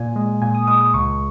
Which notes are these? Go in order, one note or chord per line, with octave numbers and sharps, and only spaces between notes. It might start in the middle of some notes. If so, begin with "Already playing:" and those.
Already playing: A#2 G#5
G#3
A#2 G#5
D#6
G#3 D#6
D#6
C#2 C#6